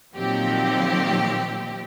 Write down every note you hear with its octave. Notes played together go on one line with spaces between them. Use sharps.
A#2 D#3 F3 F#3 C4 G4